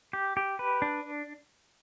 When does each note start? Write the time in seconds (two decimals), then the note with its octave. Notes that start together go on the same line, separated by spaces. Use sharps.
0.13 G4
0.37 G4
0.59 B4
0.82 D4